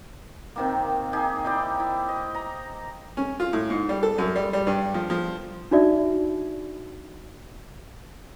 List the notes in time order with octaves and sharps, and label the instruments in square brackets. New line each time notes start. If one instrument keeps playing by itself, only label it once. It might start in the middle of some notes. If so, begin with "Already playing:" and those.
[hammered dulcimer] C3 D#3 A#3
D#4 G4 G#4
D#4 E4 D5 G5
E4
D#5
A#5
[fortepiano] C#4
F4
A2
G#2
G3
A4
F#2
G3
G3
G2
F3
F3
[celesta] D4 D#4 F#4 D5 E5